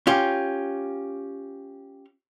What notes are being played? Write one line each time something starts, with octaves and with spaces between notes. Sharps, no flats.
C#4 F4 G4